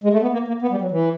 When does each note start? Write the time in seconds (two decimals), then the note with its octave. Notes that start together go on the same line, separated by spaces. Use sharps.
0.04 G#3
0.13 A3
0.22 B3
0.33 A#3
0.48 A#3
0.62 B3
0.71 G3
0.82 F#3
0.92 E3